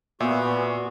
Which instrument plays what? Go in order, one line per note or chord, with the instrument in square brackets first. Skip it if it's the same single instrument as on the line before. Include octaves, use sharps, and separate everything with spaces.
[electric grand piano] A#2 [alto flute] B3 [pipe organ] F#4 C#6 [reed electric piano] D5 E5 G#5